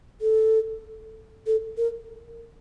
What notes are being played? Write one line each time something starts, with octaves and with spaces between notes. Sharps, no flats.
A4
A4
A#4